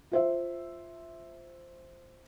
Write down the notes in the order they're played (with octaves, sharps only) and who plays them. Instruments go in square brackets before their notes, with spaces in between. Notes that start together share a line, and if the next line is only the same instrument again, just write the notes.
[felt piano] F4 C5 E5